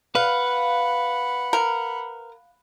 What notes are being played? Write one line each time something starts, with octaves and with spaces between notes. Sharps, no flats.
B4 F5 F#5 B5
A#4